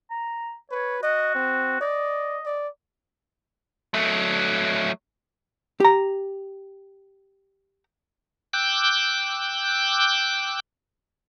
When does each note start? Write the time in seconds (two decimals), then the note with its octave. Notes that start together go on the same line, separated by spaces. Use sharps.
0.10 A#5
0.71 B4 C#5
1.03 F#4 D#5
1.35 C4
1.81 D5 D#5
2.46 D5
3.94 F#3 A3
5.80 G4 A#5
8.53 G5 D6 E6 F#6 G6